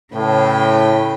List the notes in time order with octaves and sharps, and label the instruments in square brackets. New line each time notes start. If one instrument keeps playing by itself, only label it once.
[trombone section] A2 [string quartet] C#3 B4 G5